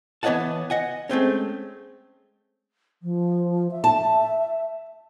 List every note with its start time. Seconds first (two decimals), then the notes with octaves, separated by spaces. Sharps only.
0.23 E3 B3 C#5 D#5 F#5 A5
0.70 D#5 F#5 G#5
1.09 G#3 A3 C4 C#4
3.02 F3
3.71 E5
3.84 A5